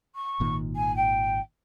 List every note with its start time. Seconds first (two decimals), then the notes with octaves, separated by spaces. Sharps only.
0.15 C#6
0.40 G#1 A#2 D#3
0.76 G#5
0.96 G5